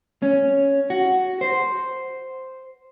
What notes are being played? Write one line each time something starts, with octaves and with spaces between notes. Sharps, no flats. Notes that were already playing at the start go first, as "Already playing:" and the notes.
C#4
F#4
C5